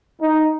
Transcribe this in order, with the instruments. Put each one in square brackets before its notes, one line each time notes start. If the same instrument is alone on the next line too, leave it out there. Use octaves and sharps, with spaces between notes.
[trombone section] D#4